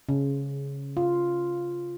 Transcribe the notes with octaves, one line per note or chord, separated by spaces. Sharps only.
C#3
F4